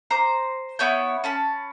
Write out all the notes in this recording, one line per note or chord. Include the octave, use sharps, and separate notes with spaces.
C5 A#5 D6
B3 E4 C#5 G6
C#4 A5 B5